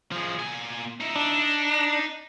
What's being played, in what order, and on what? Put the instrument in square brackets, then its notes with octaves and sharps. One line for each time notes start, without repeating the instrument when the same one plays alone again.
[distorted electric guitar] F3 G#4
A#2 G#5
D#4 E4
[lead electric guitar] D4
[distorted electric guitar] D#4